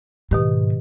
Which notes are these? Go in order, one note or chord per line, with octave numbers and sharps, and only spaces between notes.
G#2 B2 D#3 G4